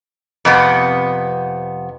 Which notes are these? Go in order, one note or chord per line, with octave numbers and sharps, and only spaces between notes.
F2 C3 B3